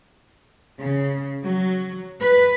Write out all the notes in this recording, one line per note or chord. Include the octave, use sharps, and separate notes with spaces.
C#3
F#3
B4